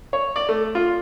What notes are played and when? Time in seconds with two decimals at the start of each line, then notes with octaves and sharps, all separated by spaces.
0.13 C#5
0.36 D5
0.49 A3
0.75 F4